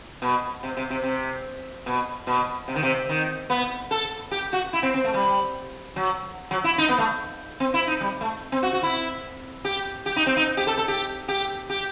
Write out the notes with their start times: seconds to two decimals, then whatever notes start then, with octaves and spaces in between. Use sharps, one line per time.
0.22 B2
0.63 C3
0.77 C3
0.90 C3
1.03 C3
1.86 B2
2.27 B2
2.68 C3
2.75 D#3
2.83 C3
3.09 D#3
3.50 B3
3.91 A4
4.31 G4
4.53 F#4
4.73 E4
4.83 C4
4.94 C4
5.04 A3
5.14 G3
5.96 F#3
6.51 F#3
6.64 E4
6.78 D#4
6.89 B3
6.98 A3
7.60 C4
7.74 E4
7.87 D#4
8.01 G3
8.21 A3
8.52 C4
8.63 F#4
8.73 F#4
8.83 E4
9.65 G4
10.06 G4
10.16 D#4
10.26 C4
10.37 D#4
10.57 G4
10.67 A4
10.78 A4
10.88 G4
11.28 G4
11.70 G4